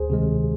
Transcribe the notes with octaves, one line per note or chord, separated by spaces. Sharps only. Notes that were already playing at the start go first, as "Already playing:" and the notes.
Already playing: D2 G#4 C5
C3 D#3 G#3